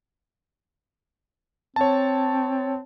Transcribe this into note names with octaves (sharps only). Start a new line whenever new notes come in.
C4 C#5 A5